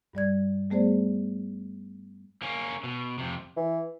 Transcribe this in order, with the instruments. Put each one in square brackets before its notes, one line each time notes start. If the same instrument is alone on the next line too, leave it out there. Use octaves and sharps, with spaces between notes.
[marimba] G2 G3 D5 G#6
G3 A3 B3 G#4 C5 D5
[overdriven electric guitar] A#3 C#4
B2
F2 C3
[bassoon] E3